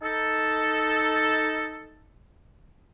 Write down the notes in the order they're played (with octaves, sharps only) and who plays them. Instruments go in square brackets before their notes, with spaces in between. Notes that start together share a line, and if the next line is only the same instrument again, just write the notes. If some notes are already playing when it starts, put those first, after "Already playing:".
[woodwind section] D#4 A4